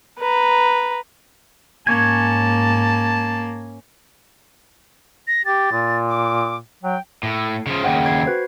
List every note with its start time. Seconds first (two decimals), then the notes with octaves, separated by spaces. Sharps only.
0.19 B4 A#5
1.87 G#2 A#3 C#4 C#5 G#5 A5
5.28 A#6
5.45 G4 A6
5.72 A#2
6.08 D6
6.83 F#3 G5
7.23 A2
7.67 C#3 F3
7.84 D#2 C#3 F#5 G5
8.06 G#6 C7
8.26 F#4 B4 C5